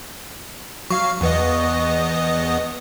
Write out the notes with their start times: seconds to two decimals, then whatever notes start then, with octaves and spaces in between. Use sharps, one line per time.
0.90 F#3 F5 C#6
1.21 E2 B3 D#5